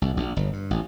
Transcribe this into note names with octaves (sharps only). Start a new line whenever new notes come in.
C2
A#1
G1
G2
A1